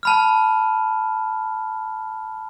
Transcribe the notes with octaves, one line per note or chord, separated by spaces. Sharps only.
A5 B5 F6